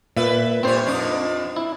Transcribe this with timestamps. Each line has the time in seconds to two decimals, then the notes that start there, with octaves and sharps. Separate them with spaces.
0.17 A#2 B4 E5
0.63 G2 A#2 C4 C5 C#5
0.86 F2 D4 D#4
1.56 E4